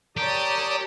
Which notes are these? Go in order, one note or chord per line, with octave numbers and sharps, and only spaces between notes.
G4 A#4 C#5 D5 A5 D#6